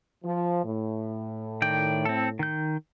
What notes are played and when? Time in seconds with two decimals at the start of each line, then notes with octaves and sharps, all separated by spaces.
0.24 F3
0.64 A2
1.62 D#3 D5 G5
2.05 C4 A4
2.39 D#3 G6